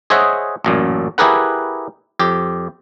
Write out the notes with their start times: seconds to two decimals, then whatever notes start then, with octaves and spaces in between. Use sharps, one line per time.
0.10 G#4 C5 C#5 D#5 E5 F#5
0.64 A1 F#2 A#2
1.18 E4 G4 G#4 A#4 B4 F#5
2.19 F2 G4